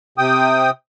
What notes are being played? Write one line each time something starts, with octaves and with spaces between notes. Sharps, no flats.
C3 G5 D#6